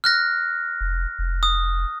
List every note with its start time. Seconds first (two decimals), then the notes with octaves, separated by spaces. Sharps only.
0.04 F6 F#6 A#6
0.81 F1
1.19 F1
1.43 D#6